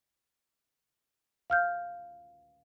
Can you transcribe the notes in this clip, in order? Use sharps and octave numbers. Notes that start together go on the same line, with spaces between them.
F5 F6 G6